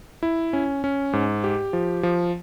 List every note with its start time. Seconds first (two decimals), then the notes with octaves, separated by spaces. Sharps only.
0.23 E4
0.53 C#4
0.84 C#4
1.13 G#2
1.44 G4
1.73 F3
2.03 F3